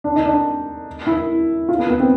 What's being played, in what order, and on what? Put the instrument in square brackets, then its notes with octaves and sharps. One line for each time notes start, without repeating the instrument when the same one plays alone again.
[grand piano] D4
D#4
D4
E4
F4
B3
B3
C4